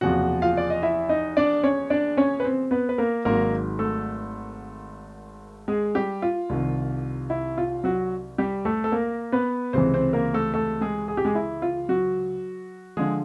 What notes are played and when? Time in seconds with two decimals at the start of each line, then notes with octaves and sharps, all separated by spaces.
0.01 F#1 E2 C3 F3 F#4 F#5
0.42 F4 F5
0.57 D5
0.70 D#5
0.82 E4 E5
1.09 D#4 D#5
1.37 D4 D5
1.63 C#4 C#5
1.90 D4 D5
2.17 C#4 C#5
2.40 B4
2.44 C4 C5
2.71 B3 B4
2.89 B4
2.98 A#3 A#4
3.25 G#1 G#2 D#3 F#3 A#3 A#4
3.79 A3 A4
5.68 G#3 G#4
5.95 G3 G4
6.22 F4
6.49 C2 C3 D#3
7.30 E4
7.58 F4
7.84 F#3 F#4
8.38 G3 G4
8.65 A3 A4
8.84 A4
8.92 A#3 A#4
9.32 B3 B4
9.73 C#2 C3 E3 C4 C5
9.94 C4 C5
10.13 A#3 A#4
10.34 A3 A4
10.54 A3 A4
10.81 G#3 G#4
11.08 G#4
11.17 G4
11.25 G#3 G#4
11.35 E4
11.62 F4
11.89 F#3 F#4
12.97 D3 F3 G#3 G#4